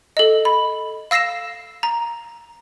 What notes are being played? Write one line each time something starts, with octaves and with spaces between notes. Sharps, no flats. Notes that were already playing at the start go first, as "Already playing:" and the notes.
A4 D#5
B5
F5 E6 A#6 C7 E7
A#5